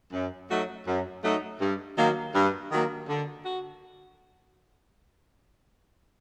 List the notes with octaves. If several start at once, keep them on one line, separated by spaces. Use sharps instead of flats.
F#2
F#3 A3 D#4 F#4
F#2
F#3 A3 D#4 F#4
G2
D#3 F#3 A#3
G2
D#3 F#3 A#3
D3
F#4